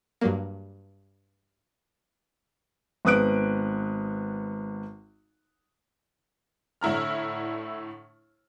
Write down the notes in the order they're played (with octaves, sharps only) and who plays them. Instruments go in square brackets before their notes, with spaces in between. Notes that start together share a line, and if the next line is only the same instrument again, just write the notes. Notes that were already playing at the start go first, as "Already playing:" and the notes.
[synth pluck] G2 F#3 A#3
[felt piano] G#1 B3 D#6 F#6 D7
[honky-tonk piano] A2 D3 E4 A#5 F6